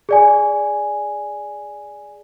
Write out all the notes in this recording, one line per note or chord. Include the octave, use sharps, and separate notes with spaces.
G#4 D5 G#5